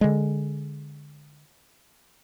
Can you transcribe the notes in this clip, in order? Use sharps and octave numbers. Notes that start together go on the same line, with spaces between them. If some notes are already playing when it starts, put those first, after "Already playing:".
D3 G#3